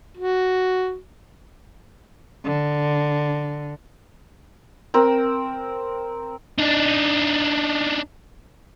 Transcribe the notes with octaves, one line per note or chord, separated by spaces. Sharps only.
F#4
D3
C4 A#4 G5
D4 D#4